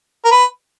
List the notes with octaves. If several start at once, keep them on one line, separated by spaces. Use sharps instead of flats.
A#4
B4